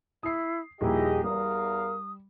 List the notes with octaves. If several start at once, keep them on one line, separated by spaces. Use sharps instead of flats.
E4 D#6 C7
D#1 F3 E4 G4 G#4 D#5 A#5
E2 G3 A#4 F5 D#6